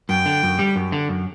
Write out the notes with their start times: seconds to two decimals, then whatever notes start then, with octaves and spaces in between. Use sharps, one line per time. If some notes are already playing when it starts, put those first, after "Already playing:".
0.09 F#2 G5
0.26 D3
0.43 F#2
0.59 G3
0.76 F#2
0.92 D3
1.09 F#2